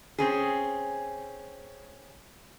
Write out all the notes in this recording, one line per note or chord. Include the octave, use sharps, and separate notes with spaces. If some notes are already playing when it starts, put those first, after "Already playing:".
C4 C#4 G#4